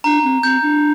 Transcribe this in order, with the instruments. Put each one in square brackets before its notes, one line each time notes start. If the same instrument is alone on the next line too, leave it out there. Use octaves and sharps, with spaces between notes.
[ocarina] D4 [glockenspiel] A#5
[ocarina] C4
[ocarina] C4 [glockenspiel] G6
[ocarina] D4